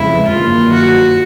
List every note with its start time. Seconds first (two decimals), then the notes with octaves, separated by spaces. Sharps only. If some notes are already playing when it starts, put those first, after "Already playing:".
Already playing: F2 C#3 E3 G#3 E4
0.27 G2 D#3 F#3 A#3 F4
0.72 F#4